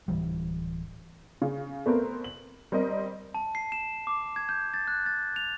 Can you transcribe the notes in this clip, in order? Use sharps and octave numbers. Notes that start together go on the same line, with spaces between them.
D1 C#2 E3 G3
C#3
A3 B3 C4 A#4
F#7
G3 C4 A#4 D#5
A5
C7
E7
D6
G#6
G6
A6
F#6
A6
F7